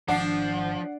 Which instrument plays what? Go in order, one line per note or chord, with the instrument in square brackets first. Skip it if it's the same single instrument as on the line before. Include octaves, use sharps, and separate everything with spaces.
[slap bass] G#1 [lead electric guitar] F3 [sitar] D4 [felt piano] F#5 C7